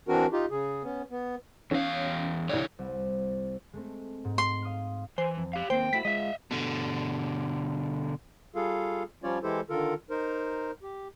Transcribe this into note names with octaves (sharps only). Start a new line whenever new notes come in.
E3 C4 D4 F#4 A#4
D#4 F4 G4
C#3 G#4
B3 C#4
B3
E2 C#4 F5
C2 D3 C#5 D5
C2
G#3 A3 C4
G#2
C6
F5 D#6 F6
E3 C5 G#5
F2
G4 F5
D#2 A#3 C4 C5 G5
A3 E4 F#4 B6
G#3 F4 D#5 E5
B2 D3
G3 F4 G#4 A4 F5
F3 G3 C#4 F4 C#5 D5
E3 G#3 E4 G4 A4 C5
D3 D#3 F4 A4 A#4
D#4 A#4 C5
G4